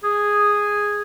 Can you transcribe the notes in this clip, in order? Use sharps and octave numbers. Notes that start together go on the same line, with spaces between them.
G#4